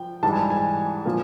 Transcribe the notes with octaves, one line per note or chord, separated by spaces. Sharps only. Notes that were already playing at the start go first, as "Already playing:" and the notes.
Already playing: F3 G5
G#2 E3 G3 A5
G#5
A5
G#5
A#2 F3